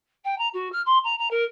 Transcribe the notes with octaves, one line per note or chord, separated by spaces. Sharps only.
G5
A#5
F#4
F6
C6
A#5
A#5
A#4